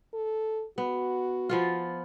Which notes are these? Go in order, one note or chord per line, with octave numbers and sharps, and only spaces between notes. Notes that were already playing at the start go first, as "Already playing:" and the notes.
A4
B3 F#4
F3 B3 F4